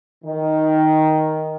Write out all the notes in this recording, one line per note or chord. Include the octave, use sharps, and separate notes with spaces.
D#3